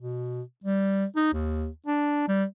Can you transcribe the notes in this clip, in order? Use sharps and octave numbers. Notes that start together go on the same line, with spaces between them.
B2
G3
D#4
D#2
D4
G3